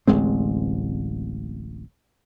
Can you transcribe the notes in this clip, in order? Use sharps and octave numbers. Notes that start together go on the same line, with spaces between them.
D1 A1 G#3 C4